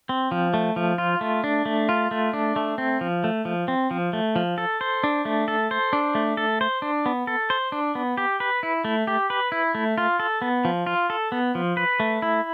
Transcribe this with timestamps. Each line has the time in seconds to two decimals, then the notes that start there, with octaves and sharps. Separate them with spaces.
0.09 C4
0.32 F3
0.54 A3
0.76 F3
0.98 F4
1.21 A3
1.44 D4
1.66 A3
1.89 F4
2.11 A3
2.33 D4
2.56 A3
2.78 C4
3.01 F3
3.24 A3
3.45 F3
3.68 C4
3.91 F3
4.13 A3
4.36 F3
4.58 A4
4.81 C5
5.04 D4
5.25 A3
5.48 A4
5.71 C5
5.93 D4
6.15 A3
6.37 A4
6.61 C5
6.82 D4
7.06 B3
7.27 A4
7.50 C5
7.72 D4
7.95 B3
8.17 G4
8.40 B4
8.63 E4
8.85 A3
9.07 G4
9.30 B4
9.52 E4
9.75 A3
9.98 F4
10.20 A4
10.42 B3
10.65 F3
10.86 F4
11.10 A4
11.32 B3
11.55 F3
11.77 B4
12.00 A3
12.22 E4